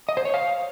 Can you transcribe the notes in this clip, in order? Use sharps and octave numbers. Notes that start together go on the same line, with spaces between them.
D#5
C5
C#5
F5